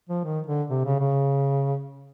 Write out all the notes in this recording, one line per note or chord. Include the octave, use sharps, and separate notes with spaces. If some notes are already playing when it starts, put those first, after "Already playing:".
F3
D#3
D3
C3
C#3
C#3